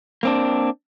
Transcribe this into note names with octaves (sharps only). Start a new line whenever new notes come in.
A#3 C4 D4